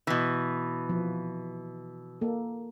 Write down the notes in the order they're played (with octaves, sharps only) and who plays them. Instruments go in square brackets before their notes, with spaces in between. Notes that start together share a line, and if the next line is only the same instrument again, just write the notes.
[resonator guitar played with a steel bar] B2 E3
[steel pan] F3
A#3 A4